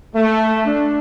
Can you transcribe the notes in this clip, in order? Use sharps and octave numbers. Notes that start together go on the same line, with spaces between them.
A3
D4